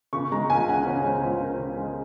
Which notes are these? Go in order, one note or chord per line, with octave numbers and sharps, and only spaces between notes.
C#3 C#6
G#3 A#5
C#2 G#5
C#4 F#5
C#3 C#5
G#3 C5
C#2 C5
C#4 A#4
C#3
G#3